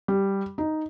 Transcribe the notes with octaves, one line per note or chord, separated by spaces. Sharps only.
G3
D#4